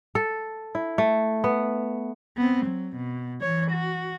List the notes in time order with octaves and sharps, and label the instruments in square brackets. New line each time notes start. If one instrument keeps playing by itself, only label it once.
[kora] A4
E4
A3
B3
[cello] B3 C4
F#3
B2
E3 C#5
F#4